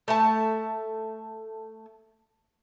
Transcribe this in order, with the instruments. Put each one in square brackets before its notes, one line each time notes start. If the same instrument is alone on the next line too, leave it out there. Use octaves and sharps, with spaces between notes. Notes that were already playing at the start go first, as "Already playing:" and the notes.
[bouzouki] A3 E5 A5